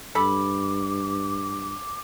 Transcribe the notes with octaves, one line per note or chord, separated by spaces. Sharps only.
G2 A4 B5 D6